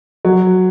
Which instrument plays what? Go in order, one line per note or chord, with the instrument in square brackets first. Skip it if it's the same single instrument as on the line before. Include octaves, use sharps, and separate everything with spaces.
[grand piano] F#3